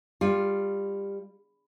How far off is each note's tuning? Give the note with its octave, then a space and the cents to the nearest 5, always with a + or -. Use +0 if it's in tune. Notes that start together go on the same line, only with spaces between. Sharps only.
G3 +20 F4 +5